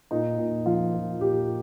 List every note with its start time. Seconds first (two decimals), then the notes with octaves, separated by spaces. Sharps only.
0.11 A#2 D#4
0.38 A#2
0.65 F3 F4
0.94 F3
1.20 A#2 G4